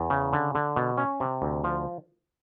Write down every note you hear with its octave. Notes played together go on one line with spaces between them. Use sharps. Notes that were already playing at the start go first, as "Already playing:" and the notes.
Already playing: E2
C#3
D3
D3
B2
C#4
C3
D2
F3